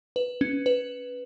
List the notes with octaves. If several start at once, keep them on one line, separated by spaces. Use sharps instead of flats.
B4
C#4
B4